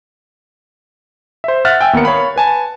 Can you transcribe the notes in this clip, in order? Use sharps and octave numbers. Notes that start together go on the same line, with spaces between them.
C5 E5
E5 F#5 F6 F#6 A6
G5 G#5 E6
D#2 B3 A#4 C#7
C#5 F5 B5
B4 G#5 A5